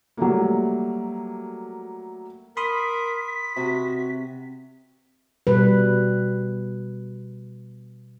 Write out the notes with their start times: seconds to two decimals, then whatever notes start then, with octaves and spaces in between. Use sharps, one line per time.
0.17 F#3 G3 A3 A#3
2.57 A#4 B5 C6 D#6 B6
3.57 C3 F#4
5.47 B2 G3 B4